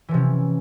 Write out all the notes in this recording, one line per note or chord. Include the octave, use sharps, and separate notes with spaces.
C3 E3 F3 C#4